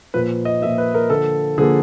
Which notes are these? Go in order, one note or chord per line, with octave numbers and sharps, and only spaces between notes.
A#2 F3 A#3 B4
D#5
A#2 F3 A#3 E5
B4
A#4
D3 F3 A#3 A4
D3 F3 A#3 G#4